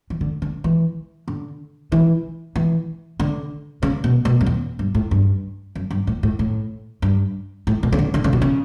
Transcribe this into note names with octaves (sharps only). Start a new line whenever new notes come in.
E3
D3
D3
E3
D3
E3
E3
D3
C#3
B2
B2
F#2
E2
G2
A2
G2
F#2
G2
A2
A2
A2
G2
A2
B2
C#3
D3
D3
C#3
B2
C#3